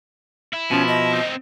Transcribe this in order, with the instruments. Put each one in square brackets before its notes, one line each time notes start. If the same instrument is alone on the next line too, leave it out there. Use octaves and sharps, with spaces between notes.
[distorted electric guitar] E4
[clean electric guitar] B2 F3 [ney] C#4
[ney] D#5
[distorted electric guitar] C4 D#4